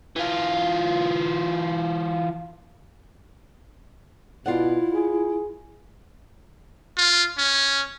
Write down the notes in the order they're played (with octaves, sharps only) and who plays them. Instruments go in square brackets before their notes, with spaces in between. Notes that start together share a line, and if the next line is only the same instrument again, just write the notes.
[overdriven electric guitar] E3 F4
[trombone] B2 [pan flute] E4 [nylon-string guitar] F4 D5 F#5
[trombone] G#4
[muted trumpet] F4
C#4